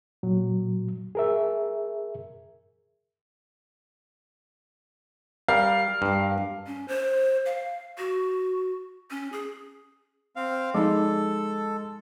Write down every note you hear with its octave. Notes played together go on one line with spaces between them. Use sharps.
A#2 F#3
G#4 A#4 E5
G3 A#4 F5
G2
C#4
C5
F5
F#4
C#4
G#4
C4 F5
F3 G#3 D#4 A4